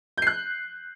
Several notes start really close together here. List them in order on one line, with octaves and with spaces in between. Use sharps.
G6 C7 F#6